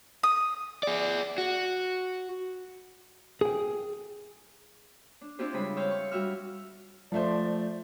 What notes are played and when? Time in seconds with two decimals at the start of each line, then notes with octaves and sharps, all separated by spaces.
0.23 D#6
0.83 G#4 D5
1.38 F#4
3.41 G#4 G5
5.21 D4
5.39 C4 D4 E4 F4 G4 C5
5.53 C#3 G3 G#3 C5 B5
5.76 C#5 E5 F5 G5 C6
5.91 C#6
6.11 G3 F#4 E5 F6
7.12 F3 A3 C5 D5